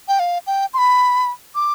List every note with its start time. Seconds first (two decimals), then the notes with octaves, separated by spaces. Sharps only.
0.08 G5
0.19 F5
0.47 G5
0.74 C6
0.78 B5
1.55 D6